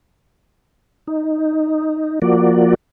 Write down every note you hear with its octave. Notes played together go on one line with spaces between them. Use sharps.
D#4
F3 A#3 F#4 D5